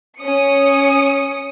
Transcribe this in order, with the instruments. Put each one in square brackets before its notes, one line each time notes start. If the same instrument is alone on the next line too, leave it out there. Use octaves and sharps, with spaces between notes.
[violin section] C#4 D#6 C#7